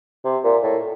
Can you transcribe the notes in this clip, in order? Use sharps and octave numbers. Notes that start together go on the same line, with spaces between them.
C3
A#2
A2